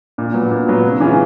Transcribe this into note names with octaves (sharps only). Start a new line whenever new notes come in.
A#2
F#3 B3
A#2
F#3 B3
C3
E3 G#3 C#4 F4